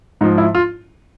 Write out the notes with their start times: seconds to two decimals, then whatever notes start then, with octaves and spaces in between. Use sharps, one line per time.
0.21 G#2 F3 D#4
0.38 E4
0.55 F4